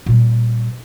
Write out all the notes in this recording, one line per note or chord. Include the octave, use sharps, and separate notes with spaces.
A#2 G3